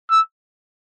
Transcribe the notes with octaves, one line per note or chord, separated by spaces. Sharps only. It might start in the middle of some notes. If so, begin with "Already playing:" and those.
E6